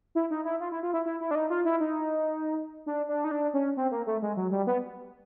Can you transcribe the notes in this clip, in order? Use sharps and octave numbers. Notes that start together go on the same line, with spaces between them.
E4
D#4
E4
F4
E4
F4
E4
E4
E4
D4
D#4
F4
E4
D#4
D4
D4
D#4
D4
C#4
C4
A#3
A3
G#3
F#3
G3
B3